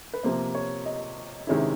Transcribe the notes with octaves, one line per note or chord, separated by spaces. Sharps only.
B4
C3 F3 A#3 C5
C#5
D#5
C3 D#3 G#3 C#4 E4